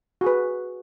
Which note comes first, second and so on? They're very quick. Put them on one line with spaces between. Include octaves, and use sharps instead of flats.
F#4 G#4 B4